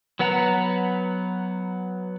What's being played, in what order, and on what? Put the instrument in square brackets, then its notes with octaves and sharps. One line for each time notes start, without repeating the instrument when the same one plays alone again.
[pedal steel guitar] F#3 B3 B4 F#5 A#5